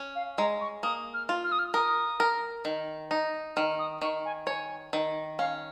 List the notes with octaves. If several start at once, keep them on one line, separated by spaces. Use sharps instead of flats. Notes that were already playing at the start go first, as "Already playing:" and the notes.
Already playing: C#4
F5
G#3 A#5
C#6
A#3 D#6
F6
F4
F6
D#6
F6
A#4 D#6
A#4
D#3
D#4
D#3 F6
D#6
D#3 C#6
G#5
C#5 G#5
D#3
C#4 F5